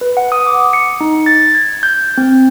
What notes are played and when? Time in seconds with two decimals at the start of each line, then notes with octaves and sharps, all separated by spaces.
0.01 B4
0.17 F#5
0.32 D#6
0.47 D6
0.73 C#7
1.01 D#4
1.26 A6
1.55 G#6
1.83 G6
2.18 C4